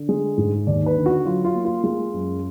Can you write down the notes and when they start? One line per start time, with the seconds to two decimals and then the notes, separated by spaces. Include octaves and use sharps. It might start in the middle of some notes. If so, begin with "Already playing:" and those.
Already playing: D3
0.09 G#3
0.37 G#2
0.67 D#2 D5
0.86 B4
0.96 D3
1.06 F#4
1.25 F#3 F4
1.44 F4
1.54 A#3
1.65 F4
1.84 G#3 F4
2.13 F#2